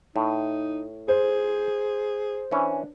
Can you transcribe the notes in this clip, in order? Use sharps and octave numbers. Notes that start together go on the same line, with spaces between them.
A2 D#4
G#4 C5
E3 C#4 D4